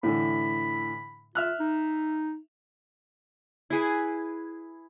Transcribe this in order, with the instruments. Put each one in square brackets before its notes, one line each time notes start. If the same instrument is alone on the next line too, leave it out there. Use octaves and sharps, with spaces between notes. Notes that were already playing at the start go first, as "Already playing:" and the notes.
[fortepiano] A2 D3 E3 [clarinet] B5
[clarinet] F4 [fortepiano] E5 F6 F#6
[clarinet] D#4
[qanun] E4 G#4 B4